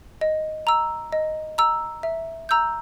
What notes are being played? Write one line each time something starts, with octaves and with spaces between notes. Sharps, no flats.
D#5
A#5 E6
D#5
A#5 E6
E5
A#5 E6 G6